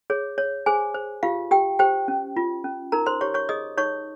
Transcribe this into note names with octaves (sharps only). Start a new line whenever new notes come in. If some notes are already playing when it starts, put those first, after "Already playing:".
G#4 C#5
C#5
G#4 C5 G#5
C5
F4 G4 F5
G4 G5
G4 C5 G5
C#4
F4
C#4
D#4 A#4 A#5
C5 C6
G4 C#5 C#6
C#5 C#6
G#4 D#5 D#6
D#4 C#5 C#6